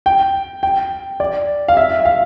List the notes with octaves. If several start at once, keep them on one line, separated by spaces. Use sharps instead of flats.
G5
G5
D5
F5
E5
E5
F5